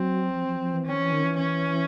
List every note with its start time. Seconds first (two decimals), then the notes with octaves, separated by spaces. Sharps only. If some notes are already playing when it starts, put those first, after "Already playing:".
Already playing: F#3 C4
0.35 F3
0.48 F3
0.60 F3
0.74 E3
0.86 D#3 C#4
0.99 E3
1.12 D#3
1.24 E3
1.38 C#4